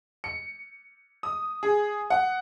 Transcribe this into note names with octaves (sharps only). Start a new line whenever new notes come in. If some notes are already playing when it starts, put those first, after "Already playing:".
C#7
D#6
G#4
F#5